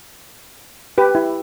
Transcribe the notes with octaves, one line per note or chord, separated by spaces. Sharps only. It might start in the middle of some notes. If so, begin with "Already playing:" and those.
G4 B4
E4